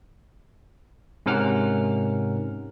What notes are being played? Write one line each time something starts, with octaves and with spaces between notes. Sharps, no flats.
G#2 C3 C#4 A#4 F#5 F6